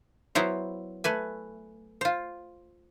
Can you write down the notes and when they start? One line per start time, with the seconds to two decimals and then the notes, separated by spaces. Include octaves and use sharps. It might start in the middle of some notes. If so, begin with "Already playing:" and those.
0.35 F#3 B3 E4 C5
1.04 A3 B4 G#5
2.01 F4 C5